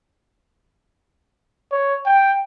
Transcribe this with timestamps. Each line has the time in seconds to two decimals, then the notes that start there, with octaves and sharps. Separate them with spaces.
1.72 C#5
2.06 G5